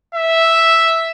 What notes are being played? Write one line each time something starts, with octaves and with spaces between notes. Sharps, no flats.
E5